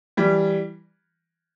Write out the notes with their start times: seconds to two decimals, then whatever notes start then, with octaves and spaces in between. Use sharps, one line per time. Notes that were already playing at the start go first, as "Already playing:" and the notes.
0.17 E3 G3